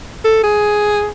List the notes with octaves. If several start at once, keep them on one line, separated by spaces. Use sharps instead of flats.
A4
G#4